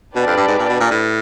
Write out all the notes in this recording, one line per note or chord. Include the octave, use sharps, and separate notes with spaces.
B2 D4 G4 B4 D5
F2
G2
G#2
A#2
B2
A#2
A2